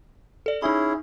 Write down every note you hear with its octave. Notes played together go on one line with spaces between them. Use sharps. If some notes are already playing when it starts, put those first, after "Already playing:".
A4 D5
C#4 D#4 E4 G#4 B5